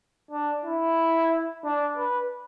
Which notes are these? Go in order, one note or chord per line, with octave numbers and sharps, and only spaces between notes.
D4
E4
D4
B4